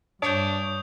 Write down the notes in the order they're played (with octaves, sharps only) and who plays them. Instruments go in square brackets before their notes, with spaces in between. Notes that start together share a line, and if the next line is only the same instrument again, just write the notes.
[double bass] G2 [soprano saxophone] D4 [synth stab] C#5 [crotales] D#6 G6